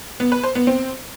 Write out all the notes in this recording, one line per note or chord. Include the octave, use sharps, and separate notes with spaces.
B3
B4
C5
B3
C4